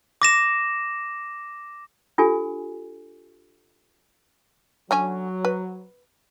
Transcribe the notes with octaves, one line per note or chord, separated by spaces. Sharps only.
D6 A#6 E7
D4 F4 G4 A4 G#5
D3 F#3 C#4 G#5
B4